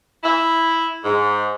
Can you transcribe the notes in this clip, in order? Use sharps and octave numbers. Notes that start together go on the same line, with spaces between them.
E4
G#2